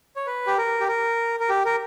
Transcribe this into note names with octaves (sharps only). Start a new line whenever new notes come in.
C#5
B4
G4
A#4
G4
A#4
A#4
G4
A#4